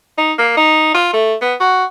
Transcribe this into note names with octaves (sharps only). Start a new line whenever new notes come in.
D#4
A#3
D#4
F4
A3
B3
F#4